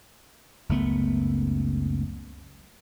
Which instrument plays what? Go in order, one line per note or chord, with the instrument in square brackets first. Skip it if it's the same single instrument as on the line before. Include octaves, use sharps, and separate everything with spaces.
[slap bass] F#1 C#2 A3 B3